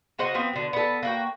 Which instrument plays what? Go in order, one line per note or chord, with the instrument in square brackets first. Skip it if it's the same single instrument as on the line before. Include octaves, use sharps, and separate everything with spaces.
[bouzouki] C#3 F#4 C5 D#5
F3 B3 C4
B2 D3
B3 A4
A#3 F#4 G5